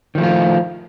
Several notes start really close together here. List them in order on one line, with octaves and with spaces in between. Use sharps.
D#3 F3 A3 F4